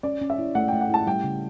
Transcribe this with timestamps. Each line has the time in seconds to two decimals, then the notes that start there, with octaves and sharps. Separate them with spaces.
0.03 C#4 D5
0.21 C#4
0.30 E5
0.38 E4
0.55 A3 F#5
0.68 G5
0.73 A3
0.81 F#5
0.90 E4 A5
1.07 G3 G5
1.24 C#3